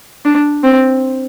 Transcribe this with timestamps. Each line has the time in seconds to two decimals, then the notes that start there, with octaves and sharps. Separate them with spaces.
0.25 D4
0.63 C4